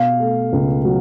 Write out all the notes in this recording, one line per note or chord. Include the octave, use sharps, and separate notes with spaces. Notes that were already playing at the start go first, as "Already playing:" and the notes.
Already playing: B2 F5
A3
C#2
F#3